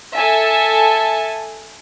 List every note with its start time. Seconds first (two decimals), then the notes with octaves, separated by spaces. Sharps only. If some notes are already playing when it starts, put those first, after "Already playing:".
0.15 A4 E5 G#5 A5